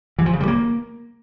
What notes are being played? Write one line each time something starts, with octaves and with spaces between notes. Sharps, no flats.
E3
F3
C#3
G3
A#3